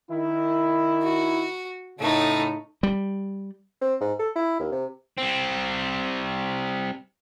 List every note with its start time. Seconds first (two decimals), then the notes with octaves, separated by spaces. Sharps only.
0.10 D#3 E4
1.03 F#4
2.00 A2 C#3 A3 D#4
2.83 G3
3.81 C4
4.01 G#2
4.19 A4
4.36 E4
4.60 D#2
4.72 C3
5.18 G3 C4